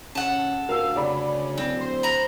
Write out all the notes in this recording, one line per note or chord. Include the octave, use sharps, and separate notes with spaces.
C#3 A4 F#5
D2 A#4 F5 E6
C#3 D5 B5
D1 C4
C5
A#5 B5